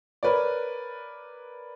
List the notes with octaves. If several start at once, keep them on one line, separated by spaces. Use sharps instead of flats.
A#4 B4 C#5 D5